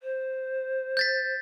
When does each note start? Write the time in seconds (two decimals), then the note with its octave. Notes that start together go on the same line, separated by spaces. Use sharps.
0.01 C5
0.97 G6 A6 B6